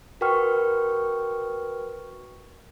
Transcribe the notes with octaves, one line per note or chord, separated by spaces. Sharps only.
F#4 A#4 B4 G5 C#6 F6